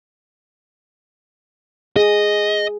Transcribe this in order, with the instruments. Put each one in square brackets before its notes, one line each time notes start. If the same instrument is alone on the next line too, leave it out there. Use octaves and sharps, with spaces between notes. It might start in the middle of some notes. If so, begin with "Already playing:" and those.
[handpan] G#4 [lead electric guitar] D#5